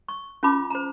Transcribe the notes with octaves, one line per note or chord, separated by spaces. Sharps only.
C#6
C#4 F4 A5 B5 D6
C5 A#5